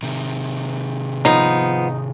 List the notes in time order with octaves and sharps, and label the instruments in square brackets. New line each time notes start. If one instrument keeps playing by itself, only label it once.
[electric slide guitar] C3 D#3
[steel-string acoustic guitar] F3 B3 [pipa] D#4